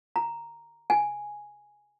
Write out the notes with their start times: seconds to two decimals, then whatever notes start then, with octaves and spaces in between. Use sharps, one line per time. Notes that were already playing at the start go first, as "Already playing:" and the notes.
0.16 A#5
0.90 G#5